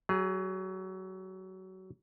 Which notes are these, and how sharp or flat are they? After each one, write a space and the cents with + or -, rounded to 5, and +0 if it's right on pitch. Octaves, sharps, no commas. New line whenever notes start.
F#3 +25 G#4 -5